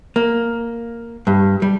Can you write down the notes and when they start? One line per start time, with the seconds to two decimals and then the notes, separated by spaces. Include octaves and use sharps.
0.16 A#3
1.27 G2
1.62 G3